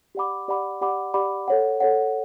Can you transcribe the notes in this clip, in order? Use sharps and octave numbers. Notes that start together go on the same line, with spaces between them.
G4 D5 F#5 B5 D6
G4 D5 F#5 B5 D6
G4 D5 F#5 B5 D6
G4 D5 F#5 B5 D6
A4 C#5 F#5
A4 C#5 F#5